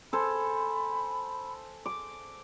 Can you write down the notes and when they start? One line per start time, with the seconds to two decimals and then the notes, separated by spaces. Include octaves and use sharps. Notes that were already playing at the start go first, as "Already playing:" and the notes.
0.13 A4 C5 G#5 B5
1.86 D6